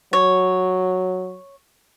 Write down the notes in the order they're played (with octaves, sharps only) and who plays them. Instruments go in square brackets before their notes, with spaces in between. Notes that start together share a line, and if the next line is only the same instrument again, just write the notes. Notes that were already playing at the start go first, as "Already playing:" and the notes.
[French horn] F#3 [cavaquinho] C#5